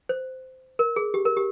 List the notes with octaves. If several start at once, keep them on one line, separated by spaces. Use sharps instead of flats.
C5
A#4
G#4
G4
A#4
G4